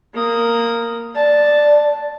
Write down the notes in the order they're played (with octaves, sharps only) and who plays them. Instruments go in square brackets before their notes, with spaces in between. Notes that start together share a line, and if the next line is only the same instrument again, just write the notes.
[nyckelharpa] A#3 D#6
[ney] D5 [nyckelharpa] A5